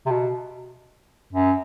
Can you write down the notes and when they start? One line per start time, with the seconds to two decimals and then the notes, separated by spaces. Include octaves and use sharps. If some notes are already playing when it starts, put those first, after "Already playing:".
0.06 C3
0.11 B2
1.33 F#2